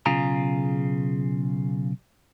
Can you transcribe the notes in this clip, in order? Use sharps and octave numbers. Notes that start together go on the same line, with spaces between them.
B1 C#3 F4 G#4 A#5